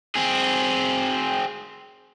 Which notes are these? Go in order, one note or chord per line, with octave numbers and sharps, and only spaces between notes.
C4 G#4